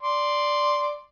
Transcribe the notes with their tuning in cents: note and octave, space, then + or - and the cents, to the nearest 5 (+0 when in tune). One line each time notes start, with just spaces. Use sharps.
D5 +0 C6 +0